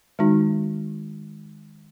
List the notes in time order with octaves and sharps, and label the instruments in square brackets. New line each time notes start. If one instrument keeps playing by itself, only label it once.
[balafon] D#3 G#3 D#4 F#4